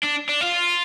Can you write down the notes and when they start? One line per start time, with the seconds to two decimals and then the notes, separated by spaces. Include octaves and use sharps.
0.03 D4
0.29 D4
0.41 F4